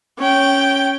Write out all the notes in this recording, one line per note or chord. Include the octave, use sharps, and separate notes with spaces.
C#4 G5